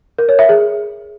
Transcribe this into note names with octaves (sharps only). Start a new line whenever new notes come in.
A#4
C#5
E5
G#4